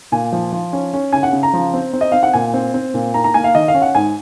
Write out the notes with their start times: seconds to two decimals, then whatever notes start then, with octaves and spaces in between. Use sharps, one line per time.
0.12 A#2 G#5
0.32 F3
0.52 F3
0.73 C#4
0.93 C#4
1.13 C#3 G#5
1.23 F#5
1.33 C#3
1.43 A#5
1.54 F3
1.74 C4
1.93 C4
2.01 D#5
2.12 C4 F5
2.23 F#5
2.33 A#2 G#5
2.54 C4
2.74 C4
2.94 A#2
3.14 A#3 A#5
3.24 A#5
3.34 A#3 G#5
3.44 F5
3.55 D#3 D#5
3.68 F5
3.75 C#4
3.82 F#5
3.95 G#2 G#5